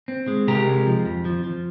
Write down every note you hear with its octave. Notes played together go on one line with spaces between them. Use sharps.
C4
G#3
C3 G4 A#4
G#3
F3
F2
F3
F3